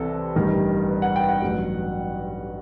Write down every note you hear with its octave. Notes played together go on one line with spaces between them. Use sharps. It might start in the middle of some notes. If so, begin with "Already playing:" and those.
Already playing: C2 C3 E3 A4
A1 G2 D#3 G3
B4
F#5
G5
F#5
A1 G2 F#3